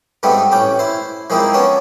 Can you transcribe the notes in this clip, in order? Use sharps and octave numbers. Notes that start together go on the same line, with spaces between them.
G#2 G3 A3 B3 C4
A1 C#4 G5 D6
E4 C5
F3 G#3 A#3 C4 D#4 E4
B3 C#4 C#5 D5 A5